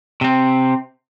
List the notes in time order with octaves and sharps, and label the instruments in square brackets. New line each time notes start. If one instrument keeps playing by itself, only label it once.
[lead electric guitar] C3 C4